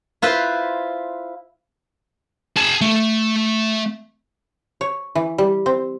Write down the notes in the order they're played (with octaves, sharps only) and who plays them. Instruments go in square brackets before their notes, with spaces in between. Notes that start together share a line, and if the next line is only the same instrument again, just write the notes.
[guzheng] E4 F4 B4 C5
[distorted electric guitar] G#4 A5
A3
[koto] C#5
E3
G3
C4